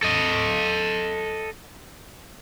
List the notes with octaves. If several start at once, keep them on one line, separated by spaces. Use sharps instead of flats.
A4 D#5